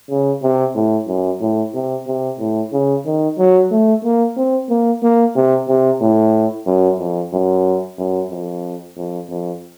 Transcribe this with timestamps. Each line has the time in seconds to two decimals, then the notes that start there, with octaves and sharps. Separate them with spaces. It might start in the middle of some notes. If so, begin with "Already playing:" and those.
0.10 C#3
0.43 C3
0.75 A2
1.08 F#2
1.41 A2
1.74 C3
2.07 C3
2.39 A2
2.73 C#3
3.06 D#3
3.38 F#3
3.71 A3
4.04 A#3
4.37 C4
4.70 A#3
5.03 A#3
5.36 C3
5.68 C3
6.01 A2
6.67 F#2
6.99 F2
7.33 F#2
7.98 F#2
8.31 F2
8.97 F2
9.29 F2